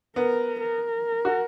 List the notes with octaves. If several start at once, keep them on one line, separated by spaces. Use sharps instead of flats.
B3 A#4
A#4
F#4